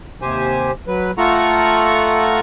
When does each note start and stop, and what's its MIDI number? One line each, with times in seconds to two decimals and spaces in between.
0.22 0.71 39
0.22 0.71 48
0.22 0.71 67
0.22 0.71 72
0.22 0.71 80
0.87 1.11 54
0.87 1.11 71
1.18 2.40 57
1.18 2.40 65
1.18 2.40 69
1.18 2.40 78
1.18 2.40 82
1.18 2.40 85